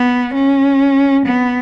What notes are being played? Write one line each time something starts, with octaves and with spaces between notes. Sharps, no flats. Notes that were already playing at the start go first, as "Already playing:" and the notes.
Already playing: B3
C#4
B3